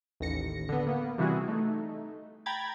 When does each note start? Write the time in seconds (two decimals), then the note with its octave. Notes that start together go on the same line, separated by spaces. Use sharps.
0.20 A1 D#2 A#6 C#7
0.69 D3 B3
0.87 A#3 B3
1.18 C3 E3 G3 E4 F#4 G#4
1.48 A3 D#4
2.46 G5 A#5 B5 G#6 A6